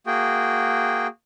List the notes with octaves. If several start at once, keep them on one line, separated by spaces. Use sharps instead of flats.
A#3 F#4 G#4 G5